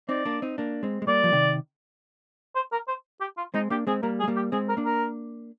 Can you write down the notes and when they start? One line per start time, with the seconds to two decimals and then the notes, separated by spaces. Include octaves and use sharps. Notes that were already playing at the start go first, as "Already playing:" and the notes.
0.09 C4 D#4 D5
0.25 A#3 D4
0.42 C4 D#4
0.58 A#3 D4
0.83 G#3 C4
1.02 G#3
1.07 G3 A#3 D5
1.24 F3
1.32 C3 D#3
2.55 C5
2.72 A#4
2.88 C5
3.21 G4
3.38 F4
3.54 G#3 C4 D#4
3.70 A#3 D4 G4
3.87 G#3 C4 G#4
4.03 G3 A#3 A#4
4.20 G#4
4.24 G#3
4.28 G3 A#3
4.36 G4
4.52 G#3 C4 G#4
4.69 A#4
4.77 A#3 D4
4.85 A#4